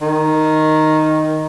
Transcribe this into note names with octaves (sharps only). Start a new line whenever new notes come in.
D#3